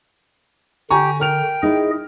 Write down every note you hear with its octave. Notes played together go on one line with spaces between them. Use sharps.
D3 G4 G#5 A#5 C#6
A#4 G5 F6 F7
D#4 E4 G#4 D#5